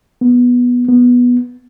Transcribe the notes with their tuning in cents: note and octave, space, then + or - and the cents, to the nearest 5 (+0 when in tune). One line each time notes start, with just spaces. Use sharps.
B3 -10
B3 -10